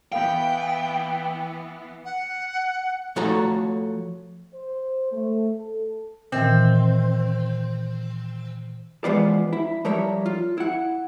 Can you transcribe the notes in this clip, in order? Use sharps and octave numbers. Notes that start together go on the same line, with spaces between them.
E3 B3 F5 G5 B5 G6
F#5
F3 A3 F#4 A4 C#5 A#5
C5
A3
A4
A#2 D#3 E3 C4
E3 F3 G#3 B3 F4 D5
E4
F3 G3 A#4 C#5 E5
F4
E4 F#5